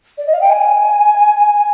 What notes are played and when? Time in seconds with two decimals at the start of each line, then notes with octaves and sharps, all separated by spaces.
0.18 D5
0.27 D#5
0.33 F5
0.41 G5
0.50 G#5